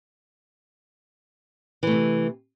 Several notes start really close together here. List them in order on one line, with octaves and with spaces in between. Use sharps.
E3 A3 C3